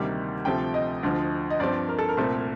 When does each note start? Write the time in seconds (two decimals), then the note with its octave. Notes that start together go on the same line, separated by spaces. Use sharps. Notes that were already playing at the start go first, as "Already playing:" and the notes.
Already playing: D2 C3 D#3 G3 A#3
0.45 D2 C3 F3 A3 C4 G5
0.74 D#5
1.03 D2 D3 F3
1.50 D#5
1.59 G2 F3 C4 D5
1.89 A#4
1.99 A4
2.09 A#4
2.17 C2 A#2 A3 C4